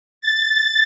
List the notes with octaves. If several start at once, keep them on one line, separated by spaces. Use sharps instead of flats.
A6